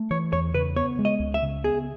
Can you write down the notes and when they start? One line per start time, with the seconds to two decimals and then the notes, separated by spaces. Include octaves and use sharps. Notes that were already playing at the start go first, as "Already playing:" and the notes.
Already playing: A3
0.11 E3 C#5
0.33 E2 C#5
0.54 C#3 B4
0.76 B3 C#5
0.99 G#3
1.05 D#5
1.20 C#2
1.34 E5
1.42 C#3
1.64 B3 G#4